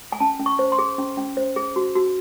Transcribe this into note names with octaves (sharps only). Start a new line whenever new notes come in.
G#5
C#4 A5
C#4
C#6
C5
C6
G#4
C#4
C#4
C5
G#4
F#4
F#4